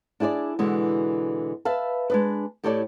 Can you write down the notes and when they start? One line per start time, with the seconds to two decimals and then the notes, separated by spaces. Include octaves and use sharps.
0.20 D4 E4 G#4 C#5 D5
0.59 B2 D3 E3 G#3
1.65 B4 E5 F5 A5
2.10 G#3 D4 B4
2.64 A2 G4 A4 C#5 D5 A5